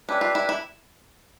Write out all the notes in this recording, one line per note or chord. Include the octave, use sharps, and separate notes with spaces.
C#4 D4 G4 B4 E5
F4
E4
E4